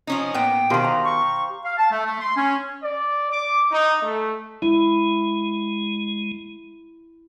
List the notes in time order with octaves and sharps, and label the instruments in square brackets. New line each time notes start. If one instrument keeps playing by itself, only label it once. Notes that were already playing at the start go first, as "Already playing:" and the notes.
[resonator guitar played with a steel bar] F3 C#4 D#4
[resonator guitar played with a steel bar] A#2 B3 [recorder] G5 [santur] D6
[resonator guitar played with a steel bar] B2 D#3 [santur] G4 C5 F5
[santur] A#5
[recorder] C#6
[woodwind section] F5
A5
A3
A3
C6
C#4
[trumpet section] D5
D6
D#4
A3
[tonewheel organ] G#3 [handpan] E4